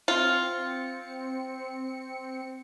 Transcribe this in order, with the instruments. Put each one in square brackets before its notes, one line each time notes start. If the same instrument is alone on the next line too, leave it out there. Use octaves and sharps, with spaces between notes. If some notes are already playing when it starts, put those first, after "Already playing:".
[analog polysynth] C4 C#7 [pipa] F4